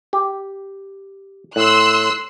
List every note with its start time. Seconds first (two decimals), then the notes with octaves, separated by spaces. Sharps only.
0.13 G4
1.56 A2 C6 E6 F#6